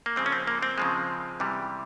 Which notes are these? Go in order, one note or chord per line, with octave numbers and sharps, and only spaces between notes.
A#3
C#3 F3 G#3 C4
C#4
C4
A#3
C4
C#3 F3 G#3
C3 E3 G3